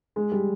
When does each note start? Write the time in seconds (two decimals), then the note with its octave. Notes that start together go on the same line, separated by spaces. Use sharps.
0.16 G#3
0.32 G3